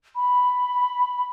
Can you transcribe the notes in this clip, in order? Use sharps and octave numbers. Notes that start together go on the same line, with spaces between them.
B5